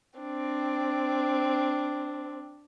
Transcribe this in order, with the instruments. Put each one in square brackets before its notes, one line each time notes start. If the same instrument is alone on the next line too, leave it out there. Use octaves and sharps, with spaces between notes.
[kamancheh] C4 D4